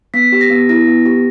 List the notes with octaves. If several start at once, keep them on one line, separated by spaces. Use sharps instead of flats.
B3 B6
G4
A#6
B3
E4 A#6
B3
G4